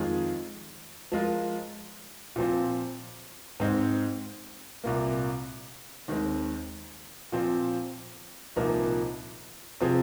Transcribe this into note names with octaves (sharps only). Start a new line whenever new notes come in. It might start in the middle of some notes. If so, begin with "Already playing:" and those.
Already playing: F2 D#3 G#3 F4 G#4
F3 G#3 F4 A#4
A#2 F3 C4
G#2 G#3 C4 D#4
C2 A#2 A#3
D#2 D#3 G#3 C4
A#2 F3 C4
C2 A#2 F3 A#3 D#4
C3 F3 C4 G#4